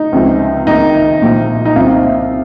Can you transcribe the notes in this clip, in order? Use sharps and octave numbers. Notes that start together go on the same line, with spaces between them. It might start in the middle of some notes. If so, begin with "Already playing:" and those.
Already playing: D#4
C#2 C3 F3
C2 C3 D#3 A#3 D#4
A#1 A#2 F3 A#3
D#4
C2 C3 F3 C4 F4